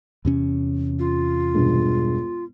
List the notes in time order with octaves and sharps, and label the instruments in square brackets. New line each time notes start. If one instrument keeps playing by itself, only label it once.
[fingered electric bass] E2 C3 C#4
[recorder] F4
[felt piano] E1 G2